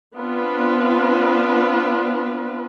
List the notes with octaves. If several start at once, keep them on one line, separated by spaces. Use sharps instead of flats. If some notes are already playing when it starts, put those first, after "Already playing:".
B3 C4 D4 F4 B4